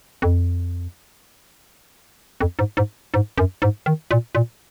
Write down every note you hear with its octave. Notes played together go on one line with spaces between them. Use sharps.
F2
F2
G#2
G#2
G#2
F#2
G#2
D#3
A#2
A#2